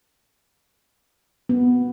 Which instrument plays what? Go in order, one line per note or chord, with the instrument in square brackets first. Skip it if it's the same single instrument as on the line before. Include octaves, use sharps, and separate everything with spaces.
[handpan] B3